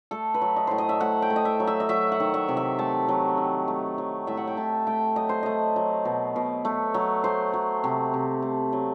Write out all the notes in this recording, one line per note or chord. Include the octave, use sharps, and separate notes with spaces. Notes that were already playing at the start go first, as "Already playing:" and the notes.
A3 A4
B4
F#3
D#5
A2 C5
D#5
E5
A2 F#5
G5
A3
D#5
E5
F#3
E5
D#5
F#3 E5
F#5
D#3
E5
C3
E5
A3 A5
F#3
D#3
A3
F#3
A2 E5
F#5
G5
A2 A5
A3 G5
F#3 D#5
C5
A3 D#5
F#3
B2
B2
A3
F#3
A3 C5
F#3
C3
C3
A3
F#3